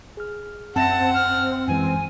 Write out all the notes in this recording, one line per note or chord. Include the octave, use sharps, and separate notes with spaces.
G#4 F6
F#2 C4 E5 F#5 A5 A#6
F6
F#2 E3 G#3 G#5